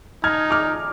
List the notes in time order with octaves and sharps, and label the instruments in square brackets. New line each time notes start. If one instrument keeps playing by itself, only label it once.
[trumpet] D#4 [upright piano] F6 G#6
[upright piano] D6 F6